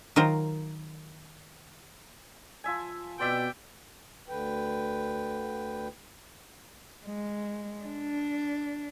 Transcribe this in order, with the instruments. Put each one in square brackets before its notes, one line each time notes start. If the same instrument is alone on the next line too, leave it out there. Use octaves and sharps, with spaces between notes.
[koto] D#3 F#3 F4 A#4 C5
[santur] F3 E5 G#5
[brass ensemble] B2 [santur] C4 D5 E5 [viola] G5
[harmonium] D2 D3 B4 G5
[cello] G#3
D4